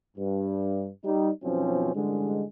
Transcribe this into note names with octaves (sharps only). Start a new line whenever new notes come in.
G2
G3 D#4
B1 F#2 B2 F3 C4 C#4
A1 G2 D3 G#3